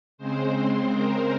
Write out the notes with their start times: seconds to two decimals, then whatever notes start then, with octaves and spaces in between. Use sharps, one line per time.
0.18 C#3 G#3 C4 C5
0.91 A#4